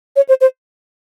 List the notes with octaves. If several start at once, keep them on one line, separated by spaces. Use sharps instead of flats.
C#5
C5
C5